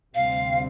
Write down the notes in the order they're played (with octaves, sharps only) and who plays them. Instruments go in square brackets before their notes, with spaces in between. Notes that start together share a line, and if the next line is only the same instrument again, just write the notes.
[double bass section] D2 C3 G3 C4 [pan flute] F5